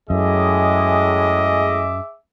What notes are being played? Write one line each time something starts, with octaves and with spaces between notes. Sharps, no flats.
F#2 A2 G#3 G#4 D#5 E5 D6